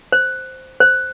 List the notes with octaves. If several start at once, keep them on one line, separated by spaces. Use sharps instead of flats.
C5
C5